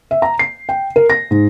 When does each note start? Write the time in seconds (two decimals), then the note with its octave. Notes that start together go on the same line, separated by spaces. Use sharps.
0.11 E5
0.22 A#5
0.39 C7
0.69 G5
0.96 A#4
1.10 A#6
1.31 G#2